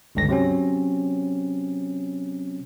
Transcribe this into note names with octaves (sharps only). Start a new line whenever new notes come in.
G#1 C#2 G2 D3 A#6
C3 F#3 C4 C#4